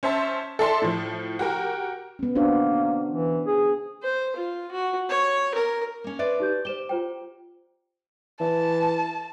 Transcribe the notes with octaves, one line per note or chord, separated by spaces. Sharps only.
C#4 C5 E5 A5
A4 D5 E5 A5 C6
A2 F3
F#4 G4 A#4
B3 C#4
A#3 D4 F#4 C5
E3
G#4
C5
F4
F#4
C#5
A#4
A#3 C#4
B4 C5 D5 E5
D#4 G4 G6
G4 C5 E7 G7
F4 C5 G5
E3 A5